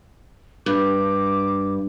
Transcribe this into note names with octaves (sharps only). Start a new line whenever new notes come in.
G2 D6